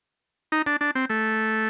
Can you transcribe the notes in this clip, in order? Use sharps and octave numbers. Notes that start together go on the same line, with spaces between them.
D#4
D4
D4
C4
A3